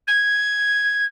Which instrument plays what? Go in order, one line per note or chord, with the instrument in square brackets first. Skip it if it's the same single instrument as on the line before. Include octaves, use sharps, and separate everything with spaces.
[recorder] G#6